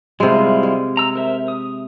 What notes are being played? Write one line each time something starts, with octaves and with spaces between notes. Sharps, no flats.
C3 G3 G#3 E4 F4
G#3
A#5 E6
A#4 C5 E5
D#6